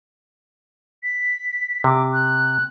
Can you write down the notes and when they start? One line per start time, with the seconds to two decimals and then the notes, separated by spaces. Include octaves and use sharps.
1.03 B6
1.84 C3 D6
2.13 F#6